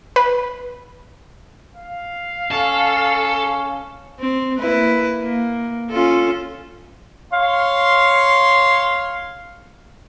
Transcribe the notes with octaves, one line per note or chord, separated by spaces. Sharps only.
B4
F5
C#4 A4
C4
A#3 E4 B4
A#3
C#4 F4 A4
C#5 F5 C6